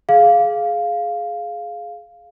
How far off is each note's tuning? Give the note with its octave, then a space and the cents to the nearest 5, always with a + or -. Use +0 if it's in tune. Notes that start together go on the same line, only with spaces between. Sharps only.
G#4 +20 F5 +0